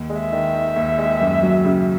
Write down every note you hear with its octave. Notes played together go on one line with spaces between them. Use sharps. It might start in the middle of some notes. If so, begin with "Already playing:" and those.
Already playing: D#2
G#3
E5
D#3
D#4
D#2
G#3
F#2
F#3
C#3